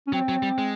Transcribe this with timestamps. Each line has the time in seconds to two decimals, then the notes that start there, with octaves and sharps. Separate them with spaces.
0.07 C#4
0.13 F#3 C4
0.29 F#3
0.43 G3
0.58 G#3